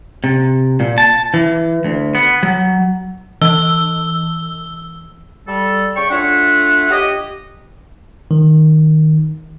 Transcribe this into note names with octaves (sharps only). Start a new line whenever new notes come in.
C3
A#2
A5
E3
D2
B3
F#3
E3 E6 G7
G3 A4
C#3 D5 G5 C#6
A3 D4 F4 C#5 E5 F#5
G4 D#5
D#3